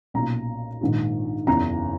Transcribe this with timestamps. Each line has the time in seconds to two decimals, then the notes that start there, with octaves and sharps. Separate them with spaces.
0.14 B1 A#2 A#5
0.81 A#1 G#2 D#3
1.47 F#1 E2 C#3 A#5